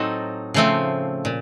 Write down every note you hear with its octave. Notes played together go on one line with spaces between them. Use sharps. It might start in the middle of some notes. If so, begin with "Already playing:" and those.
Already playing: A2 F#3 C4 D#4 F#4 A4
C#3 F3 A3 C4
A#2